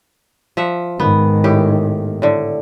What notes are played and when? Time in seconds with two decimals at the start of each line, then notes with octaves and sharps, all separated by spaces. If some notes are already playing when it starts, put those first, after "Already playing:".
0.57 F3 E5 F#5
1.00 G#2 D#3 B3
1.44 A2 G4
2.22 A2 D3